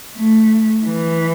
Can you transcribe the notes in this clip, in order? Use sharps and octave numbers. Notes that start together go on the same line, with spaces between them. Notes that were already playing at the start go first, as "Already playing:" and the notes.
A3
E3